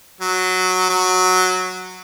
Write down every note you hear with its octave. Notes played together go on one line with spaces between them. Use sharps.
F#3
F#3